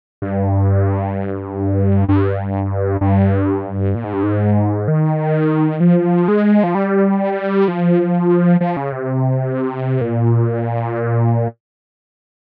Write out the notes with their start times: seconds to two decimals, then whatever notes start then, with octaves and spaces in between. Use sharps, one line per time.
0.22 G2
2.08 G2
3.01 G2
3.95 A#2
4.04 G#2
4.13 G2
4.23 G#2
4.88 D#3
5.80 F3
6.28 G#3
6.64 F3
6.75 G3
7.68 F3
8.61 F3
8.77 C#3
8.92 C3
10.01 A#2